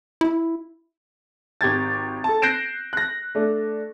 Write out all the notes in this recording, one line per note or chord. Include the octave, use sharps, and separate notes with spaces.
E4
G#1 G4 G#6 A6
A4 A5
F#6 G6 A#6 C7 D7 E7
F#6 A#6
A3 D4